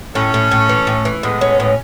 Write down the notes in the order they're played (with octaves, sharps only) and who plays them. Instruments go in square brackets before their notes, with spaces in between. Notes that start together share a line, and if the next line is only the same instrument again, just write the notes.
[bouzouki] A2 [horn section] A3 C#4
[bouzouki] A2
A2
E3
A2
E3
[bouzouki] A2 [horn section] G#3 B3
[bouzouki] C#4
A2